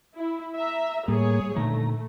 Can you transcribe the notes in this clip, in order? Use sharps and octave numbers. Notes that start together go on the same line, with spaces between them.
E4
E5 A#5
A2 G3 A#3 G#4 C#5
A#2 D3 D#3 A3 A#5